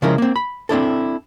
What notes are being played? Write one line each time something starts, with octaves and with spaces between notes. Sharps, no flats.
C#3 F3 G#3 C#4 E4 A#4
A#3 C4
B5
C4 D4 E4 A4